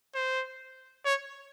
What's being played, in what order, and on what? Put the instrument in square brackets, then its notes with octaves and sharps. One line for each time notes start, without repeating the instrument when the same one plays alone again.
[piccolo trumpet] C5
C#5